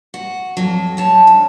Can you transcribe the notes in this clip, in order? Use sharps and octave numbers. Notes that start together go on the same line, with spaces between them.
F#4
F2 F#3
F#3 C#5 A5
D2